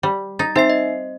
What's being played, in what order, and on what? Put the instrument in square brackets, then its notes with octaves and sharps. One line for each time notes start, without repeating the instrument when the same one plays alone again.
[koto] G3
[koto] D#4 [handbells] A6
[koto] C4 [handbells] D#4 E5 C7
[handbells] D#5